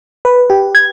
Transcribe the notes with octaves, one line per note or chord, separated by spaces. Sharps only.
B4
G4
G#6